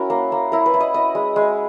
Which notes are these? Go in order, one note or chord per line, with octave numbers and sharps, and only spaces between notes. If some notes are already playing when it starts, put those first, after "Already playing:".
Already playing: C#4 E4 F#4 A#4
A#3
A#3
E4 A#4
B4
E4
D#5
E4 D#5
G#3
G#3